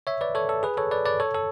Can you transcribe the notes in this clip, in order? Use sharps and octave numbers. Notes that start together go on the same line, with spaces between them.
C#5 E5
B4 D5
A4 C#5
A4
G#4 B4
A4 C#5
B4 D5
B4 D5
A4 C#5
A4